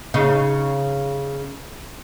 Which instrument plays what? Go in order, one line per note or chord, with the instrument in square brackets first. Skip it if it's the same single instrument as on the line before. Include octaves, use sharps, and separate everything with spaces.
[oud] C#3 D#4